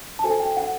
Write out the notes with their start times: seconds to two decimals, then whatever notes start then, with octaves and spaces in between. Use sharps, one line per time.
0.19 A5
0.24 F#4 A4 C5 G#5
0.40 G5
0.57 F#5